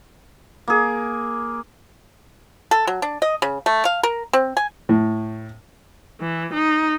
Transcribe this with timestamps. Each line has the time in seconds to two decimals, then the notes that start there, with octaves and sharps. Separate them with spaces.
0.68 A#3 G#4
2.71 A4
2.87 F#3
3.02 D4
3.22 D#5
3.42 C#3
3.66 A3
3.85 F5
4.03 A#4
4.33 C4
4.57 G#5
4.89 A2
6.21 E3
6.54 D#4